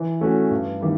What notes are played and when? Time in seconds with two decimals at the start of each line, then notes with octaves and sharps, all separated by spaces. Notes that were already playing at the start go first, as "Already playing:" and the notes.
Already playing: E3
0.21 A3 C#4 F#4
0.51 G2
0.81 D#3 G3 B3 E4